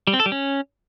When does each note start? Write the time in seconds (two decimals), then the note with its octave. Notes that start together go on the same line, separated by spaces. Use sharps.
0.07 G3
0.14 C4
0.20 A4
0.26 G3
0.32 C#4